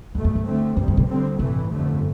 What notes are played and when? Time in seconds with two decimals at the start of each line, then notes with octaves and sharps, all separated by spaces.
0.14 B1 E2 B2 A3
0.24 F2
0.35 G2
0.46 D2 D3 A3 C4
0.77 D2 G2 C3 G3
0.88 G2
0.97 B2
1.08 D2 D3 G3 C4
1.39 A1 G2 C3 E3 A3
1.71 G1 F2 D3 A3